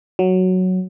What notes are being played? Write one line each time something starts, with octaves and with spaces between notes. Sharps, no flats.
F#3